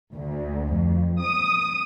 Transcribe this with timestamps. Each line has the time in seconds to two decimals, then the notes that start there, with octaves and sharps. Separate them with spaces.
0.14 D2
0.73 F2
1.20 D#6